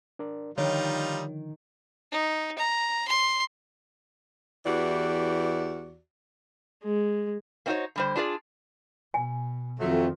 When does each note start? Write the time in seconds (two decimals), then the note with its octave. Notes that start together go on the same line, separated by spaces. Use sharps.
0.19 D4 A#4 D5
0.58 D3 D#3 F3 G3 D#4 F4 C#5
2.12 D#4
2.58 A#5
3.08 C6
4.66 E2 E3 F#4 G4 D5
6.84 G#3
7.66 A#3 C4 D#4 F#4 C5 C#5
7.96 D3 G3 C5
8.16 D4 F4 G#4 A#4 D5
9.14 B2 G#5
9.79 F2 D#3 F3 F#3 A3